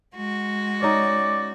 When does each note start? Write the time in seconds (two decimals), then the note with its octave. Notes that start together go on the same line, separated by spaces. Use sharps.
0.15 G#3 F#4
0.82 C#4 D#4 D5